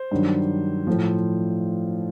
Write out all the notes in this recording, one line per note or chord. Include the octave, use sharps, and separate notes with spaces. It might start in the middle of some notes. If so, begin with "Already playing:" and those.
Already playing: C5
G2 D#3 F#3
A2 F3